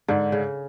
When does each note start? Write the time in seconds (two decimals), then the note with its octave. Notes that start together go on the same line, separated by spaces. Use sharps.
0.08 G#2 D3
0.32 C#3